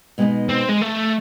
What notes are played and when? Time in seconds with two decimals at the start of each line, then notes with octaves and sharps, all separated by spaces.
0.18 B2 G#3 B3 D#4
0.49 C4
0.69 G#3
0.82 A3